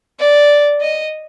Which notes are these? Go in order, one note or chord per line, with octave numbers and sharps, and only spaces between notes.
D5
D#5